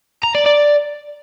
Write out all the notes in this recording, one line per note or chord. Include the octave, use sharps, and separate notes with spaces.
A#5
D5
D5